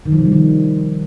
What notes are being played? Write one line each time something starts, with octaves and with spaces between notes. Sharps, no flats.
D#3
F3
C3
G3
D#3